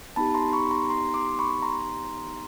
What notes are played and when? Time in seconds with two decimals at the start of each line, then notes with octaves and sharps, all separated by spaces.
0.16 B3 D#4 G4 A5 B5
0.34 A#5 C6
0.53 B5 C#6
0.71 A#5 C6
0.90 A#5 C6
1.14 C6 D6
1.39 B5 C#6
1.62 A#5 C6